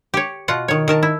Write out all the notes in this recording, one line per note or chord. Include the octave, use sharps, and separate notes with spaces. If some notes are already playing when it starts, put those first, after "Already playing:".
G4 C#5
B2 F4 F#5
D#3 C#5
D#3 A#4 A5
E4